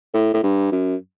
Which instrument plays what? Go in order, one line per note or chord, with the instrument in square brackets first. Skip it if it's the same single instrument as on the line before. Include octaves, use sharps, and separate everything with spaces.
[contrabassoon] A2
A2
G2
F#2